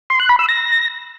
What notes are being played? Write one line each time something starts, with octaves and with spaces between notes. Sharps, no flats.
C6
F#6
B5
E6
A#6